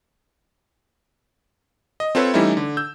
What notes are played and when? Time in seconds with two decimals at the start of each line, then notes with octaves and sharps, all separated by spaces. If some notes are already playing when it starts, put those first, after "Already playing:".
2.00 D#5
2.15 C4 F4 A4 B4 C#5
2.34 E3 G3 A3 C#4 D#4 E4
2.57 D3
2.77 E6 G6